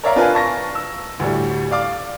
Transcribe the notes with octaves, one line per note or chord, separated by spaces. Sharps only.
A#4 C#5 D5 E5 F5 A#5
D4 F4 A#4 B4 F5 G#5
A5 C#6 A#6
E6
D2 A2 G3
D5 F5 D6